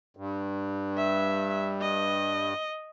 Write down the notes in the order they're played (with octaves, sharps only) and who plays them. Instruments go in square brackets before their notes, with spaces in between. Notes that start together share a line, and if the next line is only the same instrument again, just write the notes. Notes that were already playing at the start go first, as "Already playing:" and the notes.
[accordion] G2
[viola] E5
D#5